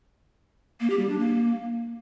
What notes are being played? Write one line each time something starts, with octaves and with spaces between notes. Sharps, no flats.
A#3
G4
G3
D4
A#3